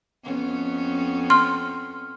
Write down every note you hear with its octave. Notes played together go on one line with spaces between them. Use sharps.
F2 B3 C#4
C6 F6